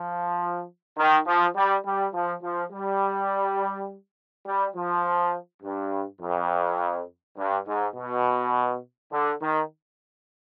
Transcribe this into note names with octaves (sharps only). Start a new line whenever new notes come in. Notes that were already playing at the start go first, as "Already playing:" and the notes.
Already playing: F3
D#3
F3
G3
G3
F3
F3
G3
G3
F3
G2
F2
G2
G#2
B2
D3
D#3